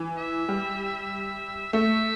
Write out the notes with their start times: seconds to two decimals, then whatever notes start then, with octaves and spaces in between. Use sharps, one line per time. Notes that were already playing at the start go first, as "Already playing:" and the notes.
Already playing: E3
0.17 E5
0.48 G3
1.73 A3 E5